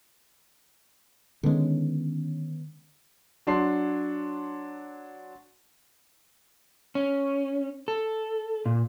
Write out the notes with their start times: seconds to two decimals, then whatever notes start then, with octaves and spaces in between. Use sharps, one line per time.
1.43 D3 D#3 G#3 B3 C#4
3.47 F#3 D4 C6 C7
6.95 C#4
7.88 A4
8.66 A#2